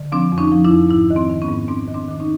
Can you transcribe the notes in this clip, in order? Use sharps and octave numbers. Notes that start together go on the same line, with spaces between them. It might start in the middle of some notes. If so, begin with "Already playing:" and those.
Already playing: D3
F3 C4 D4
F2
C#4 D#4
F3
D4 E4
F2
G#2 D4 E4
D#3
C4
D#3
B3 C#4
G#2
G#2 C4 D4
D#3
C4 D4
D#3 D4
C#4 D#4